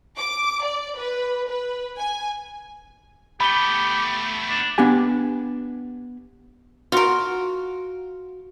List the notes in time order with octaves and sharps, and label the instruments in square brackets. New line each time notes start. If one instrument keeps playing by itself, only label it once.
[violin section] D6
D5
B4
B4
G#5
[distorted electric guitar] A3 B3 [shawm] G4 [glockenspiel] B5 G7
[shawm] D4
[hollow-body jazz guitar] B3 D4 G4 G#5
[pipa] F4 A#4 [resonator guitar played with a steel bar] F#4